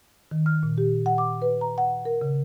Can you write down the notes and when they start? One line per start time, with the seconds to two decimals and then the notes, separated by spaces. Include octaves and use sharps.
0.31 D#3
0.46 F6
0.63 A#2
0.78 G4
1.06 F#5
1.18 D6
1.42 B4
1.61 A#5
1.78 F#5
2.05 A#4
2.21 C#3